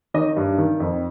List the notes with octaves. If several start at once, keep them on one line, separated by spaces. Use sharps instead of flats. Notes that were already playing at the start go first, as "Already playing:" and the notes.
D#3 D#5
G2
D#3
F2